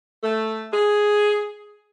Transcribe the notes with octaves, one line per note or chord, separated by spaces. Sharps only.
A3
G#4